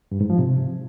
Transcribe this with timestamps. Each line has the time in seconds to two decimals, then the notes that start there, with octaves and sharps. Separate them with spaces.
0.12 G2
0.21 G#2
0.30 F3
0.39 C3